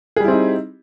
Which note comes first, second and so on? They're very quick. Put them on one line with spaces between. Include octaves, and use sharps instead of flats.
G#4 G3 E4 C4 D#4